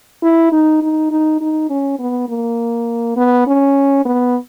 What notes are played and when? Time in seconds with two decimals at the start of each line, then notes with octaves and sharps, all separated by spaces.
0.23 E4
0.52 D#4
0.82 D#4
1.11 D#4
1.41 D#4
1.70 C#4
1.99 B3
2.29 A#3
3.17 B3
3.47 C#4
4.05 B3